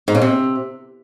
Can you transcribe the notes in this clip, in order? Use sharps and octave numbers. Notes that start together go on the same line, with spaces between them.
G#2
C#3
C3